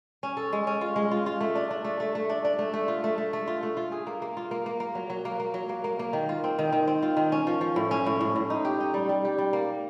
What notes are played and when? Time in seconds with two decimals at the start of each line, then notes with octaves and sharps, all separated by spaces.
0.23 C#4
0.37 A4
0.53 G#3
0.67 C#4
0.81 F4
0.96 G#3
1.11 F4
1.26 F4
1.41 A3
1.55 D4
1.70 D4
1.84 A3
2.00 A3
2.15 A3
2.29 D4
2.45 D4
2.59 A3
2.74 A3
2.88 F4
3.04 A3
3.18 A3
3.33 A3
3.47 F4
3.63 A3
3.77 F4
3.92 G#4
4.07 A#3
4.22 A#3
4.37 F4
4.51 A#3
4.66 A#3
4.80 A#3
4.95 F#3
5.10 F#3
5.25 A#3
5.40 A#3
5.54 F#3
5.69 A#3
5.84 A#3
5.99 A#3
6.13 D#3
6.29 F4
6.44 C4
6.59 D#3
6.72 D#3
6.87 C4
7.02 F4
7.17 D#3
7.32 C#4
7.47 F3
7.61 F3
7.76 A2
7.91 C#4
8.06 A2
8.21 A2
8.36 A2
8.50 D#4
8.65 G4
8.80 D#4
8.94 G3
9.09 G3
9.25 G4
9.38 G3
9.53 A#3